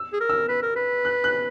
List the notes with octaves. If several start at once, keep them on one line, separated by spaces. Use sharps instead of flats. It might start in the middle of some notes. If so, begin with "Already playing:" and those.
Already playing: E6
G#4
A#4
E6
B4
A#4
B4
F#6
F#6